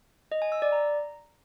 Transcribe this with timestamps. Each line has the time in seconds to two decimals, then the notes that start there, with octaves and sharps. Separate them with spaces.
0.32 D#5
0.42 G#5
0.52 E6
0.62 D5
0.72 A#5